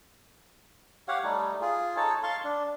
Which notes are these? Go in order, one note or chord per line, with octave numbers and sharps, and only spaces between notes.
G4 C#5 F5 F#5
G3 A3 D#4
F4 G#4
D#4 A4 C#5 A5
F5 A5 C6 C#6
D4